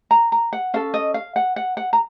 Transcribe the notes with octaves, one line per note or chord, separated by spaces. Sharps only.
A#5
A#5
F#5
C#4 A4 F5
D#5
F5
F#5
F#5
F#5
A#5